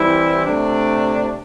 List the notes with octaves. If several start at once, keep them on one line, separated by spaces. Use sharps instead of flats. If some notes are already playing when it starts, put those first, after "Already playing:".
Already playing: E3 G3 C4 E4
C3 A3 D4